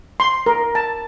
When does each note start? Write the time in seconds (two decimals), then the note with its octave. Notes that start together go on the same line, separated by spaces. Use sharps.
0.20 C6
0.46 A#4
0.75 A5